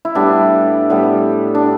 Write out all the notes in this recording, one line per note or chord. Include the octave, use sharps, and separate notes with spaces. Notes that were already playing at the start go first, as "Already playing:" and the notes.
E4
A2 G3 B3 D4
A2 G3 B3
D4